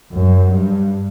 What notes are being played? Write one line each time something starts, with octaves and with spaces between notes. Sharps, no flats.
F#2
G2